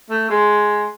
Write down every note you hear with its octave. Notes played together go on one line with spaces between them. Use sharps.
A3
G#3